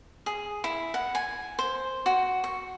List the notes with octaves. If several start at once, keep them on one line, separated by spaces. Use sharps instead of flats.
G#4
E4
F#5
G#5
C5
F#4
C#6